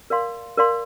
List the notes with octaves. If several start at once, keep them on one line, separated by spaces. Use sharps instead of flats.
A#4 D5 F5 C6
A#4 D5 F5 C6